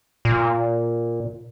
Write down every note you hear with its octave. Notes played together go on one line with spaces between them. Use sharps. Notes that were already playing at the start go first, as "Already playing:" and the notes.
A#2